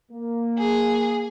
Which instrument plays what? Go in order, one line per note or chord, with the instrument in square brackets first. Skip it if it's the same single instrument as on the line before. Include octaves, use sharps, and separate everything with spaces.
[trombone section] A#3
[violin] G#4